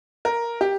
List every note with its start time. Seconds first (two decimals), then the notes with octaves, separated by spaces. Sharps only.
0.25 A#4
0.61 G4